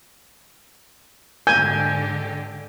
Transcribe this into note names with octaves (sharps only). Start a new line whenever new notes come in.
G#2 D3 G4 G#5 G6